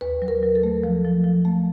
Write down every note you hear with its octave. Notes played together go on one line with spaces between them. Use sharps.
D#2 B4
F#3
A#4
F#3
A4
A3
F3
F3
F3
A3